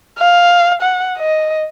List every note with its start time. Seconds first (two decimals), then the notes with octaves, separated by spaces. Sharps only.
0.19 F5
0.82 F#5
1.18 D#5